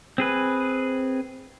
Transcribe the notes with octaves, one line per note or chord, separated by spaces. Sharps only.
C4 G#4 B4